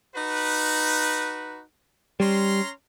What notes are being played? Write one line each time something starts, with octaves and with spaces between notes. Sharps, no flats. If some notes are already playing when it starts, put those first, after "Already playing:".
D#4 F#4 B4
G3 C#4 A#5 C6